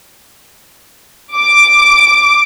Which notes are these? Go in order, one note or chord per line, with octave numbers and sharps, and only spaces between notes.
D6